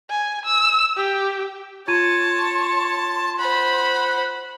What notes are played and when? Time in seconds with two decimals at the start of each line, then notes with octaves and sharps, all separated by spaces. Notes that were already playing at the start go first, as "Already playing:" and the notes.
0.10 G#5
0.45 E6
0.97 G4
1.88 F4 C#5 A5 C6 G#6 D#7
3.39 C5 F#5 B5